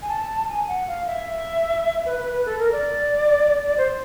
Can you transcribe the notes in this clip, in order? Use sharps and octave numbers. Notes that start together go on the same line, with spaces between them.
G#5
A5
G#5
F#5
F5
E5
B4
B4
B4
A4
A#4
D5
D5
C5